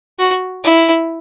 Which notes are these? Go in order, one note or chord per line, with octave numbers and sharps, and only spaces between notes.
F#4
E4